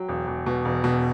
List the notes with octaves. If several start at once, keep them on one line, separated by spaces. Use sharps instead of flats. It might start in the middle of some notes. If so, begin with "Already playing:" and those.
Already playing: F#3 G5
E1
E1
B2
E1
B2